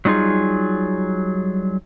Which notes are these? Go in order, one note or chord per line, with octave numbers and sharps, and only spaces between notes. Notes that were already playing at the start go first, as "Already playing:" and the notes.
F#3 G3 D#4 F4 G#4